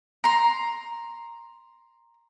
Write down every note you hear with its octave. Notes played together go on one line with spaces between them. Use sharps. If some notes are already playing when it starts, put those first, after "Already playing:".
A#5 C6